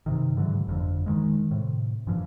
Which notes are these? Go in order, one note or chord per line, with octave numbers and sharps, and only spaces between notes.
G2 C3 D#3
G#2 D3 E3 F#3
G1 F2 D3
D#3 G#3
A2 C3
G2 A#2 E3 F3